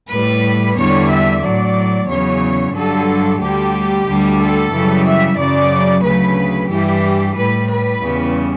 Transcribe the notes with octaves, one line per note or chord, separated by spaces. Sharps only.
A2 G3 B4
E2 D3 G3 C#5
E5
A2 F#3 D5
E2 C#3 F#3 C#5
G2 D3 F#3 A4
D2 D3 G3 G4
D2 D3 G3
A4
F#2 C#3 E3 G3
E5
F#2 C#3 F#3 D5
D2 C#3 F#3 B4
G2 E3 G3 G4
A2 G3 B4
B4
E2 C#3 G3